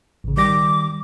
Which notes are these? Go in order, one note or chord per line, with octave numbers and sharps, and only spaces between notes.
A1 C#3
D#3 G3 D6 A#6